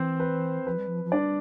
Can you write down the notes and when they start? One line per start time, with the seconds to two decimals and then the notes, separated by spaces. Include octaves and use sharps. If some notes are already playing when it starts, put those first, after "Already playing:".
Already playing: E3 C4 C5
0.20 B4
0.66 F3 B4
0.77 G3
0.87 F3
1.04 F3
1.12 G3 D4 D5